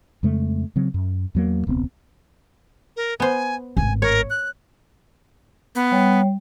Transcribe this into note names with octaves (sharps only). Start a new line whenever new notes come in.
F2 C#3 G#3 A3
C#3 F#3 C4
F#2
E2 F#3 A#3
E1 C#2 B3 C4
A#4
B3 C5 G#5
G#1 A2 G#5
A#4 C#5
F#6
B3
G3 C#5 G5